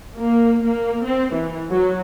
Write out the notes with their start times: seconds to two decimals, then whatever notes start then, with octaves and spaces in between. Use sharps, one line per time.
0.17 A#3
0.64 A#3
1.04 C4
1.34 E3
1.69 F#3